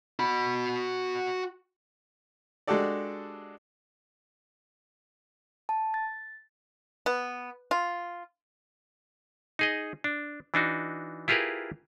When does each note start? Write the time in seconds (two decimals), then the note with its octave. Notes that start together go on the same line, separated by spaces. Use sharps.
0.19 F#4 B5
2.67 G#3 D4 F#4 G4 A4 D5
5.69 A5
5.94 A6
7.06 B3
7.71 F4
9.59 D#4 G#4 D#5
10.04 D4
10.54 E3 D4 D#4 F#4
11.28 E4 F4 G4 G#4 A#4 B4